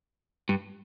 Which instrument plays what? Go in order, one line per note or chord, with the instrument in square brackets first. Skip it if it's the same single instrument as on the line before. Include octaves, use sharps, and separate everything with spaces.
[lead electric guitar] G2